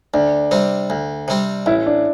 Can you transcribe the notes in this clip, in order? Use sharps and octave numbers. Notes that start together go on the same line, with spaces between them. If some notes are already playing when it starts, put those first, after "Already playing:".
D2 D4
C3 G3 C4
D2
C3 G3 C4
A1 E4
D4